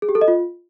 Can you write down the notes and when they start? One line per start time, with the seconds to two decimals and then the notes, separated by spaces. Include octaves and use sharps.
0.02 G#4
0.09 G4
0.15 A4
0.21 D#5
0.28 F4